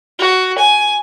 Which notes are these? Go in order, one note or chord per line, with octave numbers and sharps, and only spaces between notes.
F#4
G#5